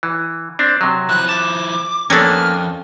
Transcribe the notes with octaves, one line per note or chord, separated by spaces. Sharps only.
E3
C4 D4
C3 F#3
F3 E4 F#6
A5 D6
F2 A#3 B3 C#4 D4 A4 F6